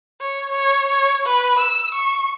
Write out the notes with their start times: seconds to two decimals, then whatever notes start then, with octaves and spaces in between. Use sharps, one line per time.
0.21 C#5
0.52 C#5
0.88 C#5
1.26 B4
1.59 E6
1.94 C#6